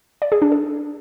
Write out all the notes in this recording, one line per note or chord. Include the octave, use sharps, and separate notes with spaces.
D5
G#4
D4
A4